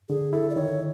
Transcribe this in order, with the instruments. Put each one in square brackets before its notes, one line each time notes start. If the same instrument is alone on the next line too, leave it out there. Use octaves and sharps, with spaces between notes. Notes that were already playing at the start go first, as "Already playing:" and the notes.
[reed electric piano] D3 [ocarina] G#4
[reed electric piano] E4 [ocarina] A4
[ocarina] D5
[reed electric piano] D#3 [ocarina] C#5